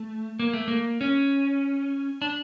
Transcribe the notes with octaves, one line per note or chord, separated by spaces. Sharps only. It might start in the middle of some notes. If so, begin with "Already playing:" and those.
Already playing: A3
A#3
A3
A#3
C#4
D4